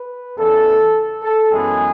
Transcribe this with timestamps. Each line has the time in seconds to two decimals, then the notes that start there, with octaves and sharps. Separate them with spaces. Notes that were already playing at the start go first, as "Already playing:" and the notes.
Already playing: B4
0.37 E2 C#3 E3 A4
1.22 A4
1.50 F#2 E3 G#3 B3 G#4